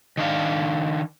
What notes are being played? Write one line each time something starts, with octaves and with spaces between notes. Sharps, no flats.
D#3 D4 F5